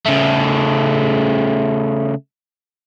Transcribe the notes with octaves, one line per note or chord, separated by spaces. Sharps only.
C#3 A3